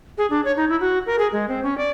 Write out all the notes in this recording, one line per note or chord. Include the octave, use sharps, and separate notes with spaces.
G#4
D4
C#5
D#4
E4
F#4
A#4
G#4
G#3
C4
C#4
D5